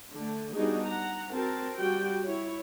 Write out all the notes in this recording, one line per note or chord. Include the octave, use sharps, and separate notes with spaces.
D3 A3
G3 B3 D4 D#4 F#4 G#4
F#5 A#5
C4 F#4 A#4 A5
G3 F#4 G5
E4 C#5